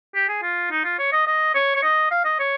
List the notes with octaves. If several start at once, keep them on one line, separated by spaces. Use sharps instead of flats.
G4
G#4
F4
D#4
F4
C#5
D#5
D#5
C#5
C#5
D#5
F5
D#5
C#5